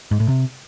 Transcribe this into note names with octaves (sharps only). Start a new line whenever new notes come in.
G#2
A2
C3